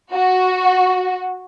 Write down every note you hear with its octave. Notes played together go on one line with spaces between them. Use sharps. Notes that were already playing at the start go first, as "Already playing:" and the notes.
F#4